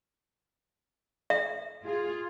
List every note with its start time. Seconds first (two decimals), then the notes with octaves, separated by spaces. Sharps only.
1.30 E5
1.83 F4 G#4